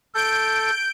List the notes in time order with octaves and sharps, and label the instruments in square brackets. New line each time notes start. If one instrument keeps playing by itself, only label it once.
[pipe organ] A4 [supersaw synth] G6 D7